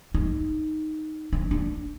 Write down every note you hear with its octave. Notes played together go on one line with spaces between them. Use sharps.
D#4
D4
D4